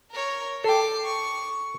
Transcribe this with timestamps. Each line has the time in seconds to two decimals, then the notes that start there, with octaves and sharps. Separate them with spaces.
0.11 A#4 C#5
0.64 A4 G5 D6 C7
1.05 C#6